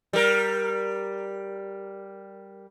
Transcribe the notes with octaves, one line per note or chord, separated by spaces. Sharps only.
G3 A#4